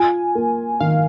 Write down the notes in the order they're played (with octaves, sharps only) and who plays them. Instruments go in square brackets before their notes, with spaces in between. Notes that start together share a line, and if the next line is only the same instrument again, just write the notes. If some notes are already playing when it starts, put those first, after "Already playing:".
Already playing: [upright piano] F4 [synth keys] G#5
[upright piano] A#3
[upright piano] D#3 [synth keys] F5